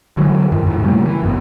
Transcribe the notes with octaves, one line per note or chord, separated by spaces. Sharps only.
D3 E3 F#3 G#3
F#2 D#3
F#2 A2
C#3 G3 A3 A#3
E3
G#1 F#2 B3